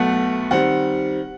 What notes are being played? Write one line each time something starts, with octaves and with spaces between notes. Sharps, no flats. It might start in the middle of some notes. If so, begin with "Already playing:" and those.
Already playing: B1 B2 A3 F#5
D#3 G3 C4 F#5